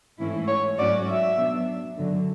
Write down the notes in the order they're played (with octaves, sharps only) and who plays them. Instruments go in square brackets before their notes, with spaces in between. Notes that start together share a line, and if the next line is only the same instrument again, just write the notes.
[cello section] G#2 E3 A3 C#4 E4
[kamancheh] C#5
[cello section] G#2 F#3 A3 C#4 F#4 [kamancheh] D5
[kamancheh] E5
[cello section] B2 F#3 B3 D4
F#2 D3 F#3